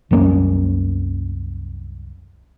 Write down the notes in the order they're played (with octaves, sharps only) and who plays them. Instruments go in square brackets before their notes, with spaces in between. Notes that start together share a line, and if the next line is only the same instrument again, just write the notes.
[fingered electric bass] C2 F#2 A#3 C#4